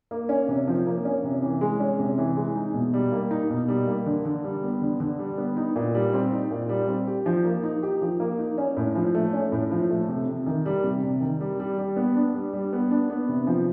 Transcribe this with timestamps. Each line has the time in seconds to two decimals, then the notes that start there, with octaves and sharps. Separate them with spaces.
0.11 A#3
0.29 C#4
0.48 C3
0.68 F3
0.86 A#3
1.05 C#4
1.24 C3
1.42 E3
1.61 G#3
1.80 C#4
1.99 C3
2.18 E3
2.36 G#3
2.55 D#4
2.74 B2
2.93 G3
3.12 A#3
3.31 D#4
3.50 B2
3.68 G3
3.88 A#3
4.06 D3
4.25 D3
4.44 G3
4.62 B3
4.82 D3
5.00 D3
5.19 G3
5.38 B3
5.57 D#4
5.76 A#2
5.95 G3
6.13 C4
6.32 D#4
6.51 A#2
6.69 G3
6.88 C4
7.07 G4
7.26 F3
7.44 A#3
7.63 D#4
7.83 G4
8.01 F3
8.20 A#3
8.39 D#4
8.58 C#4
8.77 A2
8.95 F3
9.14 A3
9.33 C#4
9.52 A2
9.71 F3
9.90 A3
10.09 C3
10.27 C3
10.46 D#3
10.66 G3
10.84 C3
11.03 C3
11.21 D#3
11.40 G3
11.60 G3
11.78 G3
11.96 B3
12.15 D4
12.34 G3
12.53 G3
12.73 B3
12.91 D4
13.09 B3
13.29 C3
13.47 F3